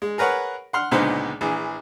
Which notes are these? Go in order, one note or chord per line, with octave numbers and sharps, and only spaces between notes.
G#3
G#4 A#4 B4 C#5 F#5
F#5 C6 F6
C#2 A#2 D3 B3 D#4 C5
A#1 E3 G#4